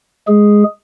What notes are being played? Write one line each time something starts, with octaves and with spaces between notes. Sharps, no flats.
G#3 G#4